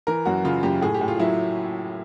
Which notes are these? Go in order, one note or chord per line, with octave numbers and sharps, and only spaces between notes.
E3 A#4
F#2 F#4
C#3 F4
F#2 G4
A2 G#4
G4
A2
F4
F#3 E4